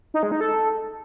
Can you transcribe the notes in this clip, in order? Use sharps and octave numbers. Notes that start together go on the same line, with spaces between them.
D#4
G#3
D#4
A4